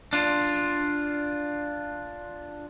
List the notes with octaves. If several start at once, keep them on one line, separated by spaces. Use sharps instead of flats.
D4 F4